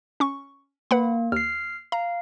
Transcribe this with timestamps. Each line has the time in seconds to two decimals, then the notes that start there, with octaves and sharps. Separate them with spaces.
0.20 C#4 C#6
0.91 A#3 B4 F#5 B5
1.32 D#2 F6 C7
1.92 F5 A#5